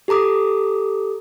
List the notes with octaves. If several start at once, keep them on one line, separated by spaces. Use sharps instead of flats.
G4 A4 A#5 D6 D#6